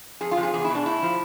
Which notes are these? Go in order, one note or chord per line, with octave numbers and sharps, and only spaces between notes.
F2 G#4
F4
C3 F3
G#4
E2 G#4
E4
B2 D4
A2 E4
F3